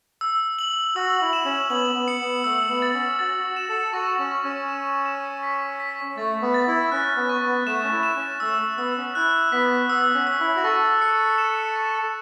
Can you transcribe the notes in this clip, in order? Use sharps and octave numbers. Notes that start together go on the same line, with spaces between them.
E6
F#7
F#4 E6
E4
E7
C#4
B3 F#7
B3
C#7
B3
A3 E6
B3
A6
C#4
F#4 A6
F#4
E7
A4
F#4 C#6
C#4
C#6
C#4
E7
E7
B6
B6
A3 A6
B3
A6
E4
C#4 F#6
B3
C#6
B3
A3 E7
C#4
E4
E7
C#4
A3 E6
B3 E6
C#4
E4 F#6
B3 B6
B3 E6
C#4
E6
E4
F#4
A4 C#6
C#7
E7
C#6